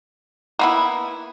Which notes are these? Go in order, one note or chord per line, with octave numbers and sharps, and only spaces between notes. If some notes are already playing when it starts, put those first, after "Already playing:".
A#3 B3 E4